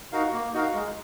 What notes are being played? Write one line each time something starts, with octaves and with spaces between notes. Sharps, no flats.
D#4 F#4 A#4 F5
A#3
D#4 F#4 A#4 F5
G#3